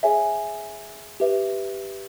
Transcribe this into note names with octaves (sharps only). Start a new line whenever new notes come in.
G#4 C#5 E5 G#5
G4 B4 E5